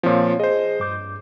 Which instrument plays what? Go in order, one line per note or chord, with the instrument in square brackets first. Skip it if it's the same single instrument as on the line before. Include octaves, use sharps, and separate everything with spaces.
[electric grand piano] A#2 F3 [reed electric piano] C4 F4 C#5
[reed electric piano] G#4 [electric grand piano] C5 D#5
[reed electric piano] G2 D6 G6